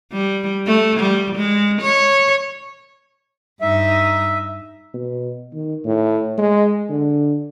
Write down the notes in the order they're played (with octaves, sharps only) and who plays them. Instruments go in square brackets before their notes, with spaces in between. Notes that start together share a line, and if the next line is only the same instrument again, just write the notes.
[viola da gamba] G3
A3
G3
G#3
C#5
[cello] G2 D#4 [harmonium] E5
[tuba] B2
D#3
A2
G#3
D3